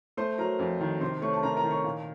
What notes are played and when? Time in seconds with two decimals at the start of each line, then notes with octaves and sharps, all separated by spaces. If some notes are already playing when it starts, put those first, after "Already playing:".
0.17 A3 C5 C6
0.38 F#3 A#4 A#5
0.59 F2
0.81 D#3
1.01 C3 C5 C6
1.22 A3 C#5 C#6
1.33 A5
1.43 C3 A#4 A#5
1.57 A#4 A#5
1.63 D#3
1.71 C#5 C#6
1.84 A#2